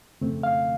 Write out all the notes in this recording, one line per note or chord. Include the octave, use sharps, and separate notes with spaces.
F2 C#3 A3 C4
F5